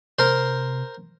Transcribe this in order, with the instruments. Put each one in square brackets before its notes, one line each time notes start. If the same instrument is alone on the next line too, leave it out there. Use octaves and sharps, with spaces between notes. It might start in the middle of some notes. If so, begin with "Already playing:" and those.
[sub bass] C3 [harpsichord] A#4 C5